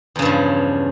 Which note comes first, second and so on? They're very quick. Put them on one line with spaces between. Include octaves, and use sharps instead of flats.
E2 C#3 G2 F3